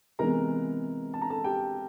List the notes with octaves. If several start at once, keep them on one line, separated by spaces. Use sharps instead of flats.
C3 E3 G#3 B3 A#4 A#5
A5
A#5
A4 A5
G4 G5